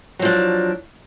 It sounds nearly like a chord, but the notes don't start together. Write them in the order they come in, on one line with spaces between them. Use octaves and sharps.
F#3 F3 D4